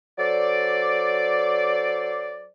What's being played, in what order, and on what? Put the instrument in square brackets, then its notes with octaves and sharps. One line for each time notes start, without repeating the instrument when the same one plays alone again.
[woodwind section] F#3 A4 C5 D5